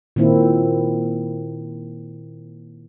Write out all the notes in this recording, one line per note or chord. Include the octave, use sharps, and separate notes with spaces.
A#2 D#3 A#3 C4 E4